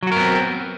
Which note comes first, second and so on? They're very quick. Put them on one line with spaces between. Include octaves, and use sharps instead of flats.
F#3 F#4 A#4 B3 C4